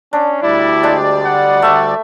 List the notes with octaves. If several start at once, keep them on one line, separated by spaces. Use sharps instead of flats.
C#4 D4
D2 G3 E4 D5
G#3 D4 G4
F#5
A3 E5